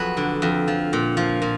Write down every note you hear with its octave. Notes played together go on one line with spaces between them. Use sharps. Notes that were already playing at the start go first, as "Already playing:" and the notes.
Already playing: F2 F#3 G#4 B4
D3
F2
F3
A#2
F3
A#2